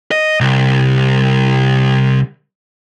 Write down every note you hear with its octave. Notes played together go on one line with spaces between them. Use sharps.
D#5
C2